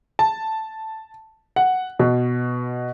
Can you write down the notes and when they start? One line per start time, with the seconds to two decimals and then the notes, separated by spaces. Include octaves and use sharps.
0.19 A5
1.56 F#5
1.99 B2